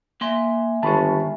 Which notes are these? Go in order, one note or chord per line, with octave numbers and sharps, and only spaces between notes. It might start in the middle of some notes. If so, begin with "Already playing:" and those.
A#3 E5 G#5 C6
G1 D#3 G#3 A5 B5 C#6